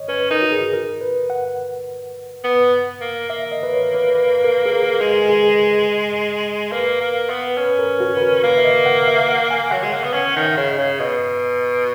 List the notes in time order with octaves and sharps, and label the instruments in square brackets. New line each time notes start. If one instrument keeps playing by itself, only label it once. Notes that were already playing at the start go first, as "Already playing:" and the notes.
Already playing: [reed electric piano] C#5 D#5
[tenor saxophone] C#4 [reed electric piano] B4
[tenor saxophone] D#4 [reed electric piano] A#4
[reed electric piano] F#4
G#4
A#4
B4
F#5
[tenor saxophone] B3
A#3
[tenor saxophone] A#3 [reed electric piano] E5
[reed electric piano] D#5
B4
C#5
B4
B4
B4
A#4
G#4
A#4
[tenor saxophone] G#3 [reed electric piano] G#4
[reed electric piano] G#4
[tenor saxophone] A#3 [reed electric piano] B4
[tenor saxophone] A#3
B3
[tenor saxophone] C#4 [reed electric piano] B4
[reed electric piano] A#4
F#4
B4
A#4
[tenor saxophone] A#3 [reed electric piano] B4
[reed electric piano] E5
D#5
F#5
E5
F#5
G#5
[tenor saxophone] F#3 [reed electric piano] F#5
[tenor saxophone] G#3
[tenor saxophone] A#3 [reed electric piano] F#5
[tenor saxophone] B3
[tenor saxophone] C#4 [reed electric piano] F#5
[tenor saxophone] D#3 [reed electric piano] F#5
[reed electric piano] E5
[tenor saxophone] C#3
[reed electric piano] D#5
[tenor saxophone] C#3
[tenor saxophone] B2 [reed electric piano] D#5